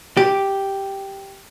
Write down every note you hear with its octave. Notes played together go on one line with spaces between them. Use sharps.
G4